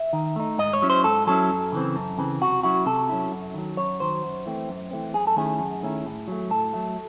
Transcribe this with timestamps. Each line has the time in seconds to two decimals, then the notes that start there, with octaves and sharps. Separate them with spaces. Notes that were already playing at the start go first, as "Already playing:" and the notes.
Already playing: E5
0.13 D#3
0.36 A3 D#4
0.58 G#2 D#5
0.73 C#5
0.82 F#3 C#4 E4
0.90 C5
1.04 G#2 A4
1.27 F#3 C#4 E4 A4
1.50 F#2
1.72 C#3 E3 C4
1.96 F#2
2.18 C#3 E3 C4
2.41 C3 F#4
2.63 F#3 C#4 E4 F#4
2.86 C3 A4
3.09 F#3 C#4 E4
3.32 F#2
3.54 D#3 F#3
3.77 F#2 C#5
4.00 D#3 F#3 C5
4.23 F#2
4.46 E3 A3 C4
4.68 F#2
4.91 E3 A3 C4
5.14 F#2 G#4
5.27 A4
5.36 D#3 A3 C#4 E4 G#4
5.60 F#2
5.83 D#3 A3 C#4 E4
6.06 A2
6.28 F#3 A3
6.50 A2 A4
6.74 F#3 A3